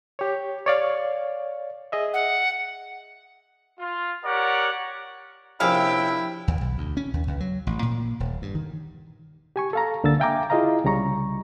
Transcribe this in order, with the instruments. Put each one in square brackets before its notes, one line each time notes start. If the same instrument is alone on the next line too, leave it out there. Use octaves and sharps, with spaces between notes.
[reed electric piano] G4 C#5
C#5 D5 F5
G#4 D#5 E5
[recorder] F#5
[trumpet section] F4
G4 A#4 C#5 D5 F#5
[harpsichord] A#1 C3 [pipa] C#4 F5 [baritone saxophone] E4 [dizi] G5
[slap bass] D#2
B1
D2
C#4
D#2
C#2
F#3
A1
A#2
D#1
G2
D#3
[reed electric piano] G4 G#5 C#6
A4 F5 A#5
C#2 D3 A#3 E6 A6
E5 F5 G5 G#5 A#5 D6
E4 F4 G#4 D#5 F5 A#5
C2 C#3 G3 A#5 C#6